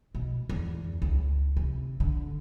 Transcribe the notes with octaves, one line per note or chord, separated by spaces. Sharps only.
B2
E2
C#2
C3
D3